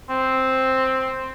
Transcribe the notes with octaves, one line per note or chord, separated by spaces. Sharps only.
C4